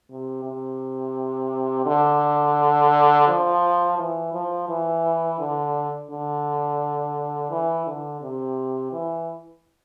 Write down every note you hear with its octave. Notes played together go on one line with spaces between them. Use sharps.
C3
C3
D3
F3
E3
F3
E3
D3
D3
E3
D3
C3
E3